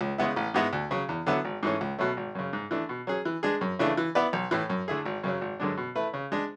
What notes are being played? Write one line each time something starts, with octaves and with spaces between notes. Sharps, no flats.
C#2
C#3 G#3 B3 E4
A1
G#2 G#3 B3 E4
D2
C#3 F#3
E2
D3 F#3 B3 E4
G#1
G#2 E3 A3 C#4
C#2
B2 F#3 A3
G#1
F#2 C#3
G#2
E3 A3 D4
B2
F#3 C#4 G#4
E3
G#3 D4 G#4
F#2
C#3 E3 A3 D4
E3
B3 E4 B4 D5
B1
A2 E3
F#2
D3 A3 E4 G#4
G#1
F#2 C#3 F#3
G#1
F#2 D3 G#3 D4
B2
A3 E4 B4
C#3
G#3 D4